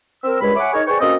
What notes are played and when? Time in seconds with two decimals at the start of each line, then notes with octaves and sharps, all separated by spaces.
0.24 C4 A#4 E6
0.40 C#2 G2 G#3 C#5 B5
0.56 C#5 E5 F#5 G#5 B5 D6
0.73 D#4 G#4 A#4 C#5
0.87 G#4 B4 C5 D5 G5 C#6
1.00 A#3 C4 C#4 F#4 A4 D#5